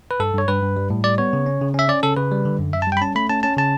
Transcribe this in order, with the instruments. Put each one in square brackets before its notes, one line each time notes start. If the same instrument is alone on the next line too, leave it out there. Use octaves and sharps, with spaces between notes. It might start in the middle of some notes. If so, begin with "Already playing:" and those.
[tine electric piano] B4
G2 A4
G2 C#5
G2 B4
G2
G3
A2
G3 D5
B3 C#5
C#3
C#4
C#3
C#4 E5
C#4 D5
C#3 A4
C#3 B4
G3
D3
F#2
F#2 E5
A5
G3
G5
B5
C#4 A5
A3 B5
C#4 A5
C#4 A5
C#3 A5